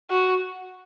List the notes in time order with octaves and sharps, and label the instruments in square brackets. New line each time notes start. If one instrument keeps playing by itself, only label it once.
[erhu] F#4